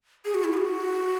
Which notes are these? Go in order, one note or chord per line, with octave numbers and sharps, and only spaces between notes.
G#4
F#4
E4
G#4
F#4